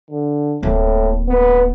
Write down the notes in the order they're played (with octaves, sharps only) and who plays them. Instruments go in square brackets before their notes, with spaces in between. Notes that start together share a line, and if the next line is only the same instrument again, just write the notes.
[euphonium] D3
[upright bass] D1 A#3 [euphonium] A2
[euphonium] B3